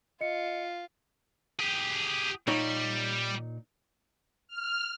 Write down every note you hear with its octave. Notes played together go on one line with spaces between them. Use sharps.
F4 D#5 C#7
G4 G#4
A#2 G3 D#4 C#5
F6